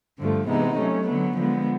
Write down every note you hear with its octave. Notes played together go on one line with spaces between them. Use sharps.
G2 D3 F3 A3
C3 E3 G#3 B3 D#4
F#3 A3 C#4
D3 F#3 B3
D3 F3 G#3 B3